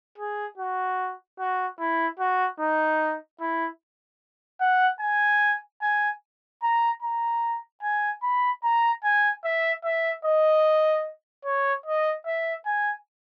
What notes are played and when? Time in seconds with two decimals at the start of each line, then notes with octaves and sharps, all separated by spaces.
0.18 G#4
0.58 F#4
1.39 F#4
1.79 E4
2.19 F#4
2.60 D#4
3.40 E4
4.60 F#5
5.00 G#5
5.82 G#5
6.62 A#5
7.02 A#5
7.83 G#5
8.22 B5
8.63 A#5
9.04 G#5
9.44 E5
9.84 E5
10.25 D#5
11.45 C#5
11.86 D#5
12.26 E5
12.65 G#5